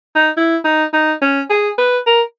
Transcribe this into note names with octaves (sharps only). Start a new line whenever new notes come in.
D#4
E4
D#4
D#4
C#4
G#4
B4
A#4